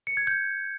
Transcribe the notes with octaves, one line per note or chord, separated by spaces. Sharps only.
C#7
G#6
G6